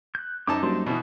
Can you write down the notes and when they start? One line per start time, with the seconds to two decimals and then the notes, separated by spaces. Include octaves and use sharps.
0.15 F#6 G6
0.47 F#2 D#4 A5 A#5 D6
0.63 F#3 G3 A#3 D4 C5 C6
0.86 B2 E3 F#4 D#6